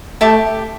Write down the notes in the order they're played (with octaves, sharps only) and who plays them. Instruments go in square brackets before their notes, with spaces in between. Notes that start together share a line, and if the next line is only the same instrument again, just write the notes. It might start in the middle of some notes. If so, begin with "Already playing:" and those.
[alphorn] A3 [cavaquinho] G4 E5 A5 D6